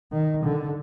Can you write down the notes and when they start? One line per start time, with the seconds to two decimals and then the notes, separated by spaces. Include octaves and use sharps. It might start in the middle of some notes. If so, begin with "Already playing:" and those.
0.12 D#3
0.44 D3